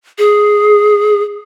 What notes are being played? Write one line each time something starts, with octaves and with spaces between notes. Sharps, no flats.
G#4